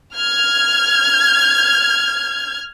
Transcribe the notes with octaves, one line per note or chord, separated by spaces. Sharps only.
F6 G#6